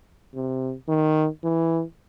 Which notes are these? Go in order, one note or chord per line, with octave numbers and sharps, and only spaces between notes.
C3
D#3
E3